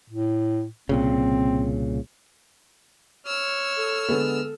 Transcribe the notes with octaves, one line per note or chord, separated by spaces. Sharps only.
A2
C2 A#2 C#3 C4
C#5 E6 F6
A4
D3 G#3 B3